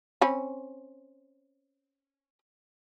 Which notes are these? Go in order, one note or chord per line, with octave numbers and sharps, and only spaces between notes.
C4 C#4 B5